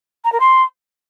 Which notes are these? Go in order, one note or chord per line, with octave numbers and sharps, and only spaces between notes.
A#5
A#4
C6